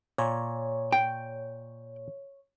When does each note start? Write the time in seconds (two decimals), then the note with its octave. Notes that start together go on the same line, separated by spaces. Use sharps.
0.18 A#2 C#5
0.93 G5